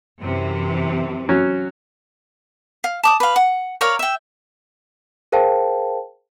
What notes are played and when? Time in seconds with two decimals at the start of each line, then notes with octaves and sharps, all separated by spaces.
0.20 F#2 C3 E3
1.29 F#3 C#4
2.84 F5
3.03 A5 D6 D#6
3.20 B4 F5
3.36 F#5
3.81 A#4 C#5 D5 F5
3.99 E5 G5
5.32 G#4 A#4 C5 F5 G5 A5